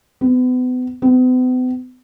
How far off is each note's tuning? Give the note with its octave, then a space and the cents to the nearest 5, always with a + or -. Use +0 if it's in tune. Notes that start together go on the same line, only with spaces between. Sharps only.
B3 +35
B3 +45